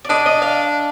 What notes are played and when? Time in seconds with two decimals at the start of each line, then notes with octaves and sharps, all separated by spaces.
0.05 D5
0.09 D4 D#5
0.26 D#5
0.42 F5